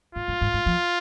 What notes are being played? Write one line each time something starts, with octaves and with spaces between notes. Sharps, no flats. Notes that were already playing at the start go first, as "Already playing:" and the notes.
G#2 F4
G2
G#2
G#2
F3